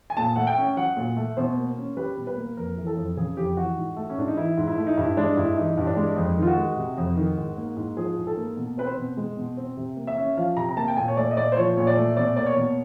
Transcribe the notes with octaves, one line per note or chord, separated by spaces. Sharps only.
G#5
A#2 A5
A3 F#5
G5
C#4
F#3 F#5
A#2
A3
B2 C5
A#3
C#4
G3 B4
B2
B4
A#3
F2 A#4
E3
A4
F2
C#3 G#4
F2 G4
E3 F#4
G#2
A3
C#4
G#2 D4
D#4
E3 E4
G#2
E4
A3
D#4
G2 E4
G#3 D4
G2 E4
E3 D#4
G2
D4
G#3
F2
D#3
F4
F#4
G#3
C3
F2
D#3
G#2
A#3
G#2
F3 G#4
G#2
A4
A#3
B2
C4 B4
C5
B2
G#3
B2
C4
C3
A#3
E5
C#4
F3 F5
C3 A#5
A#5
A#3 A5
G5
A#2 G#5
C#5
A3 D5
D#5
A#2 D5
C5
F3 C#5
A#2 C#5
D5
A3
B2 D5
A#3 D5
C#5
B2